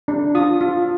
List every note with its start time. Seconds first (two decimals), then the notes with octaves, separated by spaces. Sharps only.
0.08 D4
0.35 F4 D#6
0.61 F4